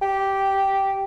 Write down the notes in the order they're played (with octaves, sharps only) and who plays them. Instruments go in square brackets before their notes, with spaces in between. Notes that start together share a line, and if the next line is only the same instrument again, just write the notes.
[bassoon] G4